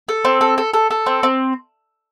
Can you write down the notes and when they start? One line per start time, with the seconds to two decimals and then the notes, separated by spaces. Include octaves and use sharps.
0.09 A4
0.25 C4
0.41 A4
0.58 A4
0.73 A4
0.90 A4
1.06 C4
1.23 C4